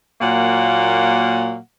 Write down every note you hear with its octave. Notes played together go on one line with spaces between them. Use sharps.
A#2 F#3 A#3 F#5